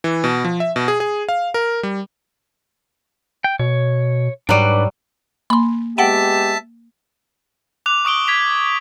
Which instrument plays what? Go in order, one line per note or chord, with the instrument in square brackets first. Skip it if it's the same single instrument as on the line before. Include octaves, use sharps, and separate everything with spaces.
[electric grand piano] E3
B2
F3
E5
B2
G#4
G#4
F5
A#4
G3
[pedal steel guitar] G5
[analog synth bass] B2 [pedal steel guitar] C#5
[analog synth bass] G#2 [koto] F#3 G3 [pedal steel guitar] D4 B4 D6
[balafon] A#3 [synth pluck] B5 C6
[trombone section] G#3 B3 G4 [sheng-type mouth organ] E5 A5 [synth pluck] F#5 G5 D7
[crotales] D6 F#6 F7
C#6 D#6 D7 G7
G#6 B6 F7